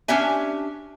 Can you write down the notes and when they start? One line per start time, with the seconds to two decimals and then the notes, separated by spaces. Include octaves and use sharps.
0.08 C#4 D4 G4 E5 G#5